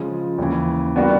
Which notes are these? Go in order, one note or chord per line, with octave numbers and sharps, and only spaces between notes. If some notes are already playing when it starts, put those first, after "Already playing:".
Already playing: C#3 F3 G#3
D#2 C#3 E3
G3 B3 D4 F#4 A#4